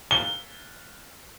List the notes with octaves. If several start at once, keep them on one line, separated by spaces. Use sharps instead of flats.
G7